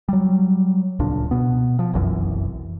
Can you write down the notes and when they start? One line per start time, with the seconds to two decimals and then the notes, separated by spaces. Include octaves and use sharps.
0.09 F#3 G3
0.99 D1 C#2 A#2 D4
1.31 B2 B3
1.79 F3
1.93 F1 B1 F#2 E3